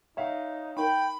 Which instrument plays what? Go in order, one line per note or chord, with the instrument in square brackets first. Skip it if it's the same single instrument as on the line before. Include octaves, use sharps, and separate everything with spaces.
[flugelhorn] D#4 [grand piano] C#5 E5 F5
[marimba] D#4 A#4 [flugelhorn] G5 [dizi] B5